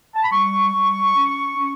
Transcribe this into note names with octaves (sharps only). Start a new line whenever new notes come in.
A5
B5
G3 C#6
G3
C#4
C#4